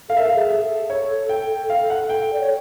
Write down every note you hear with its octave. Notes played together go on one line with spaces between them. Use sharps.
A4 F5
A#4 E5
A4 F5
G#4
E5
A4
C#5
G5
F5
F#5
G5
D5
C#5